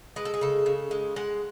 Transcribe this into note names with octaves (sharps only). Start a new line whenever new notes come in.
G#3 B4
A4
G#4
C#3 A4
C#3
G#3
G#3 F#5